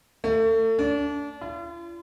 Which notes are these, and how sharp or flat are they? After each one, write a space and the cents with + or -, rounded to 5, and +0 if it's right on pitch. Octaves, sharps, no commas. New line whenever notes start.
A3 +35
D4 -30
F4 -45